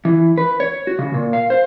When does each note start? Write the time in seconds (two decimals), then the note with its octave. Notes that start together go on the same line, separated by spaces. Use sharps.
0.05 E3
0.38 B4
0.60 C#5
0.87 F#4
0.99 C#3
1.14 A#2
1.33 F5
1.50 C5